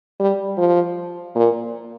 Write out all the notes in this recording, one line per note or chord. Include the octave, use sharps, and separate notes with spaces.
G3
F3
A#2